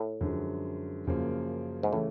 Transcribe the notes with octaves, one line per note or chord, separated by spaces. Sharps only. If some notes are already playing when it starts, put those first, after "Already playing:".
Already playing: A2
F#2 D3 F3 G#3
F#2 C#3 F3 A#3
G#2
A2 C#3 E3 A3